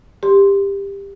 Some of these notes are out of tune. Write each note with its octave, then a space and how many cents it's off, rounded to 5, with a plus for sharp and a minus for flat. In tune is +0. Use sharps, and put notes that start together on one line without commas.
G4 +20 C6 +0